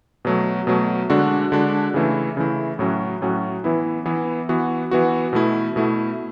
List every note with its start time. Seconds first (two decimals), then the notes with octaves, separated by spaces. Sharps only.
0.25 B2 F#3 A3
0.67 B2 F#3 A3
1.10 D3 G#3 D4 F#4
1.52 D3 G#3 D4 F#4
1.94 C#3 E3 A3 E4
2.37 C#3 E3 A3 E4
2.79 A2 F#3 C#4 F#4
3.22 A2 F#3 C#4 F#4
3.64 E3 B3 E4
4.06 E3 B3 E4
4.49 E3 B3 F#4
4.91 E3 B3 F#4
5.33 B2 A3 E4
5.76 B2 A3 E4